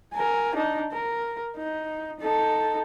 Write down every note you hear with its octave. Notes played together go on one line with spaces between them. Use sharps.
A#4 G#5
D4 D#4
A#4
D#4
D#4 A4